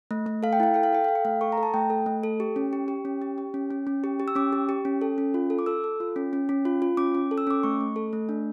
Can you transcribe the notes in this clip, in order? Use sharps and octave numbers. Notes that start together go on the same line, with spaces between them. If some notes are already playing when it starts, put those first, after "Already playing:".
A3
A3
A4 F5
G5
E4 F5
A4 G5
F5
A4 G5
A4 F5
G5
A3 F5
A4 C#6
A#5
A4
A5
A3 G5
A4
A3
A4
G4
C#4
G4
G4
C#4
G4
G4
C#4
C#4
C#4
G4
G4
E6
C#4 D6
G4
G4
C#4
A4
C#4
F4
A4
D6
A4 E6
A4
F4
C#4
C#4
C#4
F4
F4
C#4 D6
C#4
A4
E6
C#4 D6
A3 C#6
A3
A4
A3
D4